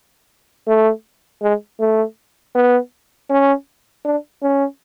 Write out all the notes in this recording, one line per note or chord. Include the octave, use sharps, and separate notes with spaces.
A3
G#3
A3
B3
C#4
D4
C#4